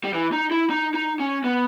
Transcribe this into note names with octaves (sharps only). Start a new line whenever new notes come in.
G3
E3
D#4
E4
D#4
D#4
C#4
B3